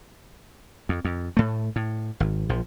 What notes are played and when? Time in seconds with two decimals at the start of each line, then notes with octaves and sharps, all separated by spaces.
0.89 F2
1.05 F2
1.37 A2 A3
1.76 A2
2.20 G#1
2.49 A#1 F3